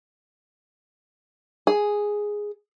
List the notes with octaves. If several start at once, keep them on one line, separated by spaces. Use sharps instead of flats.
G#4